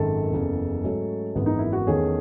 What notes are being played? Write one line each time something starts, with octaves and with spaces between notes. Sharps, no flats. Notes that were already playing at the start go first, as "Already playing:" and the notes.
Already playing: G#1 F#2 D#3 G#3 A4
F#1 E2 C#3
G#2 F#3 A3 C#4
G#1 F#2 E3 G#3 B3
D#4
E4
F#4
E2 D#3 A3 C#4 G#4